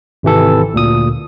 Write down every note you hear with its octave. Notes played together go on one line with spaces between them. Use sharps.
G#1 C3 E3 A4
D2 A#2 D#6